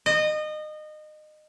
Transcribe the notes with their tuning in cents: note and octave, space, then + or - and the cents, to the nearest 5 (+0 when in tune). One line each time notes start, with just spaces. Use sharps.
D#5 -25